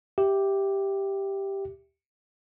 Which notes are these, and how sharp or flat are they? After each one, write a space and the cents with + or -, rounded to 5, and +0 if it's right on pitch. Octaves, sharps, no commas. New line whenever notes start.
G4 +0 E5 +0